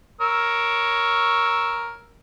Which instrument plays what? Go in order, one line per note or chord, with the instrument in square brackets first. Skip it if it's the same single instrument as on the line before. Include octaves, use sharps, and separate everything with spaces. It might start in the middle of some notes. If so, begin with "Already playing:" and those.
[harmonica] A#4 C#5 E6